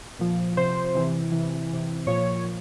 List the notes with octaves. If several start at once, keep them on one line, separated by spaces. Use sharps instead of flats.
A#2 F3
C3 F3 C5
C3 E3
C3 E3
C3 E3
A#2 F3 C#5
A#2 F3